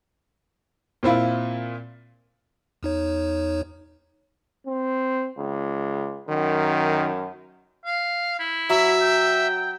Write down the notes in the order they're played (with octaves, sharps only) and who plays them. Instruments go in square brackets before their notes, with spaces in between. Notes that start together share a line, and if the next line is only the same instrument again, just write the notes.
[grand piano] A#2 C4 E4 F4
[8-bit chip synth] E2 D#4 C#5
[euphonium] C4
C#2
[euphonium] F#2 [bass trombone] D#3
[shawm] F5
E4
[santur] F#3 [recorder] E5
[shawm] G5